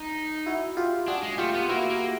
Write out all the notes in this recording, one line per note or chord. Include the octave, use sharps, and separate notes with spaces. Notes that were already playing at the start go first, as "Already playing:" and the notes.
Already playing: D#4
E4 F#4
F4 G4
D4 F#4 G#4
G#3
A3 F4 G4
B3
A#3 E4 F#4
A#3